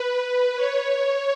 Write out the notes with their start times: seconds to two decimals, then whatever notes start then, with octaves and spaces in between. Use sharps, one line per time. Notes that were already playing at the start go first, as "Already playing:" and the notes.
Already playing: B4
0.56 C#5